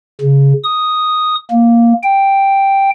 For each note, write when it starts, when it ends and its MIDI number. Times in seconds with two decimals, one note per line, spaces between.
0.21 0.53 49
0.64 1.35 87
1.51 1.93 58
2.03 2.90 79